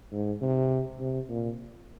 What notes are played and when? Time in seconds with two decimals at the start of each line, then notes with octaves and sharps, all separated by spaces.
0.12 G#2
0.42 C3
0.99 C3
1.29 A#2